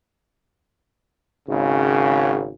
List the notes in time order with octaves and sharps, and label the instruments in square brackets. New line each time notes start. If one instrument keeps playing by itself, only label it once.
[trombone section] G#1 C#3